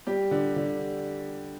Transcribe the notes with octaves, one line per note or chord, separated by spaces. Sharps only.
G3 G4
D3
D3